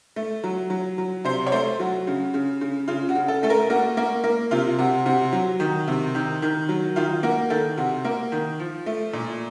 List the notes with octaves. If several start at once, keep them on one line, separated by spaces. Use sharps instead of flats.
A3
F#3
F#3
F#3
C3 C5
C#5
A3 C5
F#3 F#4
C#3
C#3
C#3
C#3 F4
F#4
C#3
A4
A3 A4
A#4
A#3 F#4
A#3
A#3
C3 F4
C3 F#4
C3 F#4
F#3
D#3
C3
D#3
D#3
F#3
D#3 F4
A#3 F#4
D#3 A4
C3 F#4
A#3
D#3
F3
A3
A#2